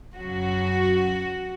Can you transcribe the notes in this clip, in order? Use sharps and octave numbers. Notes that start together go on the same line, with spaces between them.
F#2 C#3 F#3 F#4